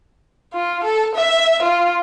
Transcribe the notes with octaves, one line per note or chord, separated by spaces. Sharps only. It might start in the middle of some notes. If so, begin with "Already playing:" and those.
F4
A4
E5
F4